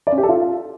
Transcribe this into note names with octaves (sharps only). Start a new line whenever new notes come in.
D5
C#4
G4
A4
F4